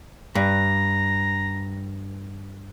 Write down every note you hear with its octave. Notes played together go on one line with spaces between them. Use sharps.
G2 A#5